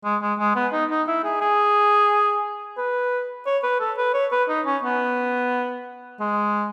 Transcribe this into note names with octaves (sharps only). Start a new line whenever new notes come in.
G#3
G#3
G#3
B3
D#4
D#4
E4
G#4
G#4
B4
C#5
B4
A4
B4
C#5
B4
D#4
C#4
B3
G#3